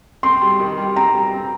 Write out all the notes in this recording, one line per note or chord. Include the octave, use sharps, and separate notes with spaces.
C4 C6
G3
D#3
G3
C4 A#5
G3
C4